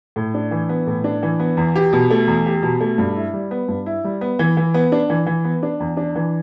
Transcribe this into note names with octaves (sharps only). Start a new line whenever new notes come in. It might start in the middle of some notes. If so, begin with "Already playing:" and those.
A2
D4
E3
B3
A2
D4
E3
B3
E2
G4
B2
A3
E2
G4
B2
A3
G2
E4
G3
B3
G2
E4
G3
B3
E3
E3
B3
D4
E3
E3
B3
D4
E2
D4
E3